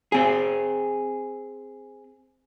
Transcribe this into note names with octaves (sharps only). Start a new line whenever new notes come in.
C4 G#4